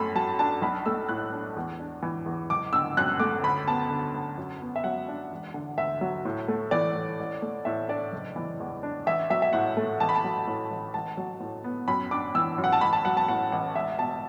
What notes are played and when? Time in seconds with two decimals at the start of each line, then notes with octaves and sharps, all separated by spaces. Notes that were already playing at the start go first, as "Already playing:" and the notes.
Already playing: F#2 A3 B5
0.15 F#3 A5
0.39 D4 A5
0.62 B1 B5
0.86 A3 E6
1.09 A2 F#6
1.33 D4
1.56 E2
1.79 D4
2.02 E3
2.26 E2
2.50 F#1 D6
2.73 D3 E6
2.97 F#2 F#6
3.20 A3 D6
3.43 D2 B5
3.67 B3 A5
3.90 D3
4.14 D2
4.37 F#2
4.61 B3
4.76 E5
4.84 F#3 F#5
5.08 D4
5.32 E1
5.54 D3
5.77 D2 E5
6.01 F#3
6.25 A2
6.48 A3
6.71 E3 D5
6.95 A2
7.19 A1
7.42 A3
7.65 A2 E5
7.89 D4 D5
8.13 F#1
8.36 E3
8.60 E2
8.83 D4
9.07 A1 E5
9.30 F#3 E5
9.42 E5
9.53 A2 F#5
9.77 A3
10.00 A1 A5
10.09 B5
10.16 A5
10.24 F#3
10.47 A2
10.71 A1
10.94 A1 A5
11.17 F#3
11.40 A2
11.64 B3
11.88 F#2 B5
12.11 D4 D6
12.35 E3 E6
12.58 F#2
12.64 F#5
12.73 A5
12.81 A1 B5
12.93 A5
13.05 F#3 F#5
13.17 A5
13.28 A2 F#5
13.52 A1 F#5
13.75 E1 E5
13.99 B2 A5